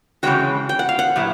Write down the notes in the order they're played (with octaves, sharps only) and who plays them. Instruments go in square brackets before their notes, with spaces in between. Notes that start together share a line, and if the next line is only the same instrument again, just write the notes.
[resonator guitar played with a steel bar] C#3 E3 G#3 C#4 F#4 [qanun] G5
[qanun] G5
F#5
F5
F#5
[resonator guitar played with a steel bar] A#2 F#3 B3 E4 G4